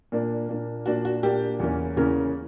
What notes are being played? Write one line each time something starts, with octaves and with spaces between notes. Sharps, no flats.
A#2 A#3 D4
A#2 A#3 D4
A#2 A#3 D4 F#4
F#4
A#2 A#3 D4 G4
E2 C#3 E3 A#3 C#4
E2 C#3 E3 A#3 C#4 A#4